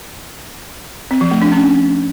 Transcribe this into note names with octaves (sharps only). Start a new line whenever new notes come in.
C4
F3
A3
D4
C#4